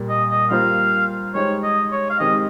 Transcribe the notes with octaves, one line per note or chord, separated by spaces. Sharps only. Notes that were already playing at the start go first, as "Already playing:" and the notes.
Already playing: A#2 G3 A#3
D#5
D#5
G3 A#3 F4 C5 F5
G#3 D#4 G4 C5 C#5
D#5
C#5
F5
D#3 G#3 C4 G4 D#5